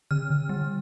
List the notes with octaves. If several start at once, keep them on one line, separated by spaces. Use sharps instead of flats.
D3 F6
D3
G3